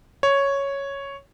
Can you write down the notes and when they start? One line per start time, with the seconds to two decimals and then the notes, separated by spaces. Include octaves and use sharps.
0.23 C#5